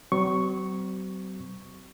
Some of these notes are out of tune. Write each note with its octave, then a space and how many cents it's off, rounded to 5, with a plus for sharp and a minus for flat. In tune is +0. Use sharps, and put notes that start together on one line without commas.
F#3 +40 C4 -30 C#6 +0